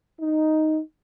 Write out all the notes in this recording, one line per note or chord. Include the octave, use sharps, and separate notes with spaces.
D#4